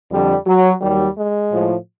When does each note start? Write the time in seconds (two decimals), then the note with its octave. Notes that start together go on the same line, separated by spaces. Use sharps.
0.11 F2 D3 F3 G3
0.46 F#3
0.81 D#2 D#3 F#3 G3
1.15 G#3
1.51 A2 F3